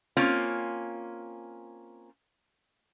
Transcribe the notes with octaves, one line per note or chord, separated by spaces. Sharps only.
A#3 C4 C#4 F4